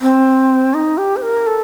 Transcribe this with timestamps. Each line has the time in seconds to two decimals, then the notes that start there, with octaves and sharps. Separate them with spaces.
0.01 C4
0.74 D#4
0.98 G4
1.16 C5
1.22 A#4
1.47 A4